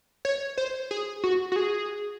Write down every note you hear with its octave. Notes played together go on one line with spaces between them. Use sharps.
C#5
C5
G#4
F#4
F#4
G#4